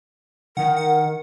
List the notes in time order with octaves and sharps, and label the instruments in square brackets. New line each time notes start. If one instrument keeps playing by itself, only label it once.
[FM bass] D#3 [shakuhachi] A#4 [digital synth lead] F#5
[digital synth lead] F#5